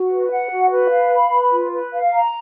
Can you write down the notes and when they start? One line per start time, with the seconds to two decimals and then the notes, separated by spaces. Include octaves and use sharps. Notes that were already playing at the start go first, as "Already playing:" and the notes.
Already playing: F#4
0.10 B4
0.31 F#5
0.50 F#4
0.71 B4
0.91 F5
1.11 B5
1.32 B4
1.51 F4
1.73 B4
1.92 F5
2.13 A#5